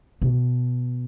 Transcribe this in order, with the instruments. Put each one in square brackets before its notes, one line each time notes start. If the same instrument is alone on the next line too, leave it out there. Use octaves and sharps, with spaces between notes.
[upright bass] B2